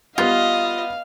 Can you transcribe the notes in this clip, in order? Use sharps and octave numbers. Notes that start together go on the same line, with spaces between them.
G3 B3 F4 B4 D#5 F5